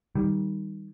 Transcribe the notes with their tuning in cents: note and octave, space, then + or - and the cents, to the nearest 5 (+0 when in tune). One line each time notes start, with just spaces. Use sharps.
D#3 +0 G3 +0